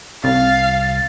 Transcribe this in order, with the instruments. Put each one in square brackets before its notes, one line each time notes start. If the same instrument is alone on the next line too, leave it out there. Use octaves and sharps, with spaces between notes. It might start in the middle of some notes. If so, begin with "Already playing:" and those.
[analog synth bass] C2 [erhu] F5 [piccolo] A6